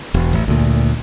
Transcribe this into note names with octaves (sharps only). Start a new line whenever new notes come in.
E1
A1
D2 A#2